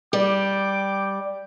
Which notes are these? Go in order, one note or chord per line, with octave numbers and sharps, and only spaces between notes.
G3 G5 D6